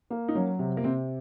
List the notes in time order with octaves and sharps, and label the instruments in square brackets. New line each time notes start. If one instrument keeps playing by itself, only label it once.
[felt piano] A#3
[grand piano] D#4
[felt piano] F#3 [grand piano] C#4
[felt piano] C3
[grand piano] A#3
[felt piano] C3 [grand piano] C4